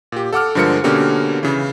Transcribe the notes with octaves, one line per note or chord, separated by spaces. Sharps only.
A#2 G4
A4 F#5 D6 F6
G2 D3 F3 G#3 A#4 C#7
B2 D3 A#3 C#4 G4 A#4
C#3 E3